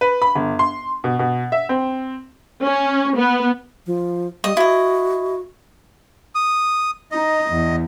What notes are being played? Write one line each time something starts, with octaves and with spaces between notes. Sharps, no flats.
B4
B5
G1
C6
B2
B2
E5
C4
C#4
B3
F3
G3 D#5
E4 F#4 D#5
D#6
D#4 D#5
E2